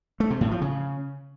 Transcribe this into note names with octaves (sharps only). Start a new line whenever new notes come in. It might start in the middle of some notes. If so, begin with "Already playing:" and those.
A3
C3
A2
F3
C#3